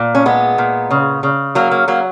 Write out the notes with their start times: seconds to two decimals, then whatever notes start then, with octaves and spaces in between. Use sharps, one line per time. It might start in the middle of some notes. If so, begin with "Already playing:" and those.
Already playing: A#2
0.15 C#4
0.26 G#3 B3
0.58 A#2
0.91 C#3
1.23 C#3
1.55 F#3 A#3
1.71 A#3
1.88 F#3 A#3